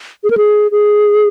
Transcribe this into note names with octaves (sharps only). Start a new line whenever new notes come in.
G#4
A#4
G#4
G#4